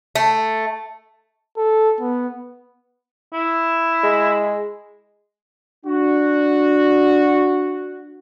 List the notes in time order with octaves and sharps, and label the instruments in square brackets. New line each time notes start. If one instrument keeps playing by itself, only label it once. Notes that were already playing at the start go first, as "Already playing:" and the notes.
[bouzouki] A3
[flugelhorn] A4
B3
[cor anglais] E4
[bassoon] G#3
[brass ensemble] D4 F#4